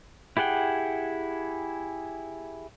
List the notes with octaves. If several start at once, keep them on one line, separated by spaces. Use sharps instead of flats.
E4 G4 G#4 F#5 G5